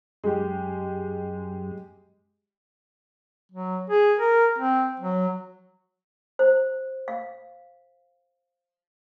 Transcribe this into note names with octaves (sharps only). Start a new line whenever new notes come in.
F#2 G#3 G4
F#3
G#4
A#4
C4
F#3
C5
F5